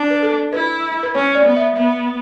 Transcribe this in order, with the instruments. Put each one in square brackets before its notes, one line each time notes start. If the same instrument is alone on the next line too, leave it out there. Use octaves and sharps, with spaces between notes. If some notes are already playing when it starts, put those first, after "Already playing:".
Already playing: [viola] D4
[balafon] B4
A4
[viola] E4 [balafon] B4
[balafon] B4
[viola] C#4 [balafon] C#5
[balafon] D5
[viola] B3
[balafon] E5
[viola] B3 [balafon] E5